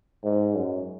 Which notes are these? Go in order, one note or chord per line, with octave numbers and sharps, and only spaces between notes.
G#2
F#2